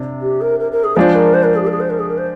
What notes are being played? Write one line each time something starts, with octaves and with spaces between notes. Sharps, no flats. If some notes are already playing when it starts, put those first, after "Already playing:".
Already playing: C3 D4
G4
A#4
A#4
A#4
G#4
F3 G#3 D4 F4 C5
A#4
C5
A#4
G#4
G4
A#4
G#4
C5
A#4
G#4
A#4
C5